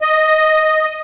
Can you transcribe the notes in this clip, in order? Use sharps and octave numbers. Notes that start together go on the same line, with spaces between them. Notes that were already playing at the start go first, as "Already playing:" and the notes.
D#5